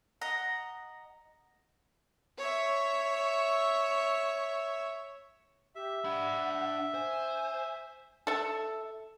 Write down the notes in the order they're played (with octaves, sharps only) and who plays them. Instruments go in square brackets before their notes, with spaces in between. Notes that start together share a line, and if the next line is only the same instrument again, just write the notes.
[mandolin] D#5 F#5 A#5 D#6
[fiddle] C#5 E5
[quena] G4 [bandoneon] E5
[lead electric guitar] D4 B5 [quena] F#5
[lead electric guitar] C5 [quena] G#5
[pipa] A4 E5